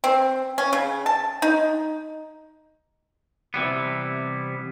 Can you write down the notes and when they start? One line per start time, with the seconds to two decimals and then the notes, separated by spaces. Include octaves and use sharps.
0.04 C4
0.58 C#4
0.73 C#3
1.06 A5
1.42 D#4
3.54 C3 E3 G3 B3